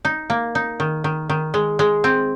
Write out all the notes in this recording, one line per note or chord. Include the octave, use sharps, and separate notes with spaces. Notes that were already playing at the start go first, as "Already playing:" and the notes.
D#4
A#3
D#4
D#3
D#3
D#3
G#3
G#3
C4